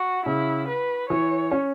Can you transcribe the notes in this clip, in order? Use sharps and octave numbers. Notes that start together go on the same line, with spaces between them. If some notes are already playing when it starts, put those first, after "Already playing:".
Already playing: F#4
C#3 E4
B4
E3 C#5
C#4